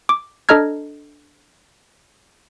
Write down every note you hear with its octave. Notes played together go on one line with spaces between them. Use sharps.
D6
D4 A4 D#5 A#5 F6 G#6